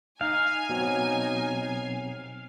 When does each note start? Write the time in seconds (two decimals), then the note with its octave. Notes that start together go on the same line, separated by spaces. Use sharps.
0.21 D#4 F5 G#5 C7
0.69 B2 F#3 C4